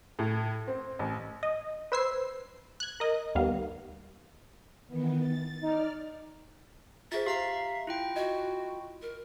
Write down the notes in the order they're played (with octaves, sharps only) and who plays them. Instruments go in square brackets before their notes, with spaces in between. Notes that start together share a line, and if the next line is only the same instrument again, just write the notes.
[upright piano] A2
C4
A1
[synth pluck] D#5
B4 C5 E6 G#6 C7
F#6 G#6
A#4 D#5
D#2 G3 A#3 B3 F5
[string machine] D#3 E3 B3
A6
[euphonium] D#4 [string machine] D5 F6
[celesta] F4 G#4 C5 [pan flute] E5 [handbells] A6
[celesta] G4 [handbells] F5 A#5 C7
[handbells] E4 F4 G5
[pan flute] F#4 [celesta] D#5
[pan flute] A#4